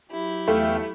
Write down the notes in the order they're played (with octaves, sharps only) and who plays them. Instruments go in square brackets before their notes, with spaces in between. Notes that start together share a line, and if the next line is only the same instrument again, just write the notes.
[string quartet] F#3 E4 G4
[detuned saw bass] E2 [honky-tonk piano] A3 [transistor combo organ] E5 F5 G5